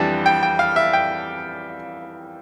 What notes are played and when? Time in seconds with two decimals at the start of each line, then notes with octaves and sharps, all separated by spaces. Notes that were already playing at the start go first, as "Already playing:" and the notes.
Already playing: F2 E3 G3 D4 A5
0.26 G5
0.43 G5
0.59 F5
0.76 E5
0.93 G5